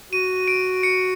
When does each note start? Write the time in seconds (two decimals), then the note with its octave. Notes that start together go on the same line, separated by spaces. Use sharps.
0.12 F#4 D#7
0.48 D7
0.83 C#7